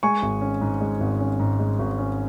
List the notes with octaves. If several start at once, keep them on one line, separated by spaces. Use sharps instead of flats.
G#3 G#5 C#6
G#1
C#4
G#2
G#3
G#1
C#4
G#2
G#3
G#1
C#4